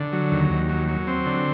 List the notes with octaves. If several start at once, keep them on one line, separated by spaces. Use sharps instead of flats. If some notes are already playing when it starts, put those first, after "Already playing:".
Already playing: D3
F#3
D#2
D#2
F#3
F#3
C4
D3